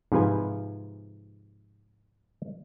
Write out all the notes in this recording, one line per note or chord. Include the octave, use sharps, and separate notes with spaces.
G#2 C3 F3 B4 F5 G#5